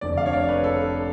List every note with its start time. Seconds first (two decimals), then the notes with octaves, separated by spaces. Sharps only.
0.01 F1 F2 D3 D5
0.17 F5
0.26 C#5
0.33 D5
0.49 B4
0.64 A4